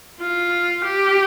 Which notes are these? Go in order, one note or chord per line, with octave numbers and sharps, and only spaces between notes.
F4
G4